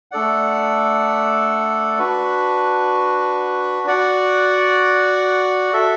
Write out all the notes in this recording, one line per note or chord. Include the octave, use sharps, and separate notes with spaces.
A3 D4 A4 D5 F#5
D4 F#4 B4
F#4 D5 F#5
F#4 A4 E5